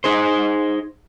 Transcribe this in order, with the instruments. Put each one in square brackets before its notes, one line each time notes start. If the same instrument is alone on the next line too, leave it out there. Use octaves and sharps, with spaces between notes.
[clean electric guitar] D#4 G#4 C5